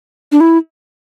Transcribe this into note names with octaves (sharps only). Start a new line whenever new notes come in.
D4
E4